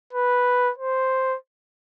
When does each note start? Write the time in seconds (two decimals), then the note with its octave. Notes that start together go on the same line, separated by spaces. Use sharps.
0.13 B4
0.78 C5